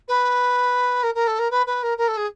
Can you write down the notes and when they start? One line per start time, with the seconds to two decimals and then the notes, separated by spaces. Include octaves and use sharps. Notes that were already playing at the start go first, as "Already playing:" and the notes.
0.08 B4
1.03 A#4
1.15 A#4
1.27 A4
1.39 A#4
1.51 B4
1.66 B4
1.83 A#4
1.98 A#4
2.08 A4
2.17 G#4